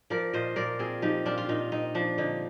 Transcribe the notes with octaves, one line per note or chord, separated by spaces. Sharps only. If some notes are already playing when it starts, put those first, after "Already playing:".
F3 A#4 D5
A#2 C5 D#5
A#2 A#4 D5
C4 F4 G#4
F3 D#4 G4
A#2 D4 F4
F4
A#2 D#4
C4 D#4
F3 D4
D3 D#4